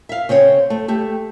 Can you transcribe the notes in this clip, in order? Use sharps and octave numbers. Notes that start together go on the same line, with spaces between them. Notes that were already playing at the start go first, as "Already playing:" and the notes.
E5 F5
C#3 C4 C5 C#5
A3
A3 G4